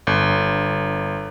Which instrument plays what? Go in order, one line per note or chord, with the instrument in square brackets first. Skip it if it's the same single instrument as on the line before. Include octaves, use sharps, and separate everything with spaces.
[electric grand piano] G1